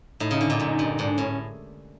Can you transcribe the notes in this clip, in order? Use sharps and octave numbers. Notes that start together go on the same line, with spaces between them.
A2 D#4
C#3
D3
A#2
F#2
G2
G#2 D4
A2 C#4